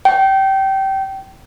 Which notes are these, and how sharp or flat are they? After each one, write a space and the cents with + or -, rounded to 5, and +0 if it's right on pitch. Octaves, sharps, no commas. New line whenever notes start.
G5 -20